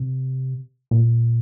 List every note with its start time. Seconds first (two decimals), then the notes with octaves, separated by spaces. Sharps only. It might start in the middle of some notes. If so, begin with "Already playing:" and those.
Already playing: C3
0.91 A#2